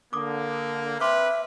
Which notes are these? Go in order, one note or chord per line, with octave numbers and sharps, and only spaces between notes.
D3 A#3 D6 D#6
C4 B4 E5 C6 D6 F6